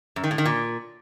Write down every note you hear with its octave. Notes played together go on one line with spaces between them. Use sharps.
F#2
D#3
A2
D#3
A#2